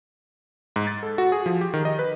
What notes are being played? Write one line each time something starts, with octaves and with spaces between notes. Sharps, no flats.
G#2
A6
A4
F#4
G#4
F3
G4
D#3
D#5
B4